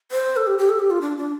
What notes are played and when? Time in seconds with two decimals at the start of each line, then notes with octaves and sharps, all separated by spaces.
0.12 C5
0.37 A4
0.47 G4
0.58 G4
0.69 A4
0.79 G4
0.90 F4
1.01 D4
1.17 D4